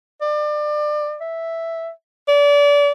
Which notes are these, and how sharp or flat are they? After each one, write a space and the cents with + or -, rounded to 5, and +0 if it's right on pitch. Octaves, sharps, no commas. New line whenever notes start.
D5 +30
E5 +0
D5 -30